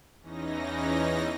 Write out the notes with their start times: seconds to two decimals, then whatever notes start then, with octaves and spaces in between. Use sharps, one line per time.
0.22 E2 E3 C#4 D#4 A#6